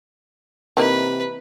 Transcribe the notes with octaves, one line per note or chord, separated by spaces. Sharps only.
C3 E3 A#3 D#4 B4